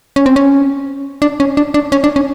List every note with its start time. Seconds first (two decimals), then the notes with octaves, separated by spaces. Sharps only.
0.16 C#4
0.26 C4
0.36 C#4
1.22 D4
1.40 C#4
1.57 D4
1.74 D4
1.92 C#4
2.04 D4
2.16 C#4